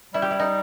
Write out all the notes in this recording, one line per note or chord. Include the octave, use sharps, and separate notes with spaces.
G3 E4
G4
E4
D#4